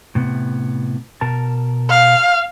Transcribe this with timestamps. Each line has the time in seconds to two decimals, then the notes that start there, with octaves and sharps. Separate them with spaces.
0.15 A2 C3 B3
1.21 B2 A#4 A5
1.90 F5